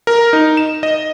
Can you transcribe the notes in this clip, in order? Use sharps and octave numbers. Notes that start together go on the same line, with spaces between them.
A#4
D#4
E7
D#5